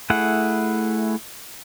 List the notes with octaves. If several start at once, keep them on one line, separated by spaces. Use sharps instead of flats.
A3 E4 G#4 F#5